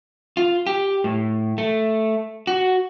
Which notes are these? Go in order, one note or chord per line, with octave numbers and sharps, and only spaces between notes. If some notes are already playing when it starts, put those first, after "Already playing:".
F4
G4
A2
A3
F#4